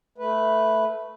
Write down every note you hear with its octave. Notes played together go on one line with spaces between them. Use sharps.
A3 B4